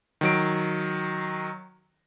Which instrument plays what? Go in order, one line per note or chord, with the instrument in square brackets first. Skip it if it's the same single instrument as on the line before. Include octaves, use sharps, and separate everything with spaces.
[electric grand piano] D#3 F#3 D7